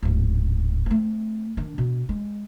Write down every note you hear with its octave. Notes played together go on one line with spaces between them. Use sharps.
D1 G#2
A3 C4
D#3 D4
B2
G#3